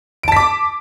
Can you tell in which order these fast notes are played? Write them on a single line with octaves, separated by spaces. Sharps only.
D7 A5 B6 D6